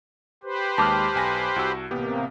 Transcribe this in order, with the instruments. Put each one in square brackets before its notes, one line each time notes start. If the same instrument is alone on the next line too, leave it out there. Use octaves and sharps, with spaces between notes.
[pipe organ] G4 B4 C5
[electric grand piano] D#2 G#3 F6 [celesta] A5 D6
[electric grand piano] B1 G#5 A#6
C2 F#4 E6
[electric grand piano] A1 B3 G4 [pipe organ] C3 A#3